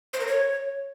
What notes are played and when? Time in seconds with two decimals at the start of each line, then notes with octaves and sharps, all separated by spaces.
0.13 C5
0.20 A#4
0.27 C#5